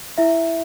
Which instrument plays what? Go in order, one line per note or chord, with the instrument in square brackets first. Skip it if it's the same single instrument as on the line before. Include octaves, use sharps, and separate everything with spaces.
[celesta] E4 E5